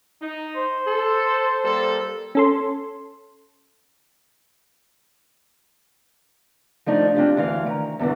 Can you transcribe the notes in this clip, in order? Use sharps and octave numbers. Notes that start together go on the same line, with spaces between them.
D#4
C5
A4
G3 A#3 A4
C#4 A4 C6
F3 A3 D4 D#4 F4
C4 D4 F4 G4
D2 E3 F5
D#3 A#5
E2 G2 D3 E3